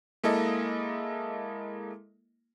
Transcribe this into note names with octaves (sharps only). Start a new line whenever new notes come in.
G#3 A#3 E4 A4 D#5